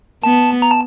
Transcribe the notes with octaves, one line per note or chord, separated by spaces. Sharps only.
B3 A5
A#5
A5